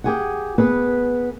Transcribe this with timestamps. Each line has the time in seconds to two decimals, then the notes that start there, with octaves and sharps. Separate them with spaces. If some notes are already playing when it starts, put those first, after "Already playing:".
0.04 G4 G#4 F#5
0.58 B3 G#4 B4